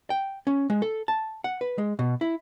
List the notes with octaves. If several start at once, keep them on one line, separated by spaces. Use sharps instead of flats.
G5
C#4
G#3
A4
A5
F#5
B4
G#3
B2
E4